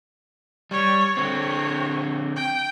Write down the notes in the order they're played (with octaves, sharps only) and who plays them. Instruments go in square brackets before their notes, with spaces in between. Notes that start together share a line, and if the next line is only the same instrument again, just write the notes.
[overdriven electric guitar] G3 [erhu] C#5
[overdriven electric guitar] D3 C4 [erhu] C#5
[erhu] G5